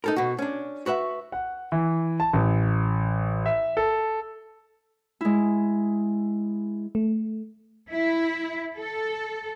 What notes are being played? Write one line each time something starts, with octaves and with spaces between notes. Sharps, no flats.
D#4 A4 A#4
B2 F#4
C#4 D4
F#4 B4 E5 F#5
F#5
E3
A5
A1
E5
A4
G#3 E4
A3
E4
A4